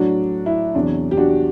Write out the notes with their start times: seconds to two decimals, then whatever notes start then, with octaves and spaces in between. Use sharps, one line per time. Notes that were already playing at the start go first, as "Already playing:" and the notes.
Already playing: A2 F#3 D4 F#4
0.46 E4
0.75 E2 C3 F#3 D4
1.11 G4
1.17 D4 F#4